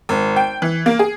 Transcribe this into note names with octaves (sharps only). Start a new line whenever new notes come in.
G#1
G5
E3
A#3
G#4